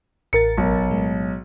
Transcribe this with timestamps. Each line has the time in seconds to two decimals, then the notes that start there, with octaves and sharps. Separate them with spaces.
0.33 A1 A#4 A6 C#7
0.58 B1
0.90 A2 G#3